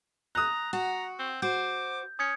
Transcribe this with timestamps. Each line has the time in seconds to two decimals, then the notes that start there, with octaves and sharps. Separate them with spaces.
0.35 A#5 D#6 F#6
0.73 F#4 A#5
1.19 C4
1.42 F#4 C5 D6 G6
2.19 C#4 D#6 G#6 C#7